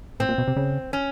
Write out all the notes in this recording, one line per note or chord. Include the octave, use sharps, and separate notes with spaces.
A2 C4
A#2
B2
C3
C#3
C#4